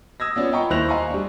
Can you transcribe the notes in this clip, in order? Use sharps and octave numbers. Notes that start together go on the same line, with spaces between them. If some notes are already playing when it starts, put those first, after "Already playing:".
D#6 E6 G#6 A#6
B3 C#4 F4 D5
F4 D#5 G5 A#5 B5 C#6
D#2 E4 C5 F#6 A#6 F7
D#5 F5 G#5 A#5 C6 C#6
G3 D4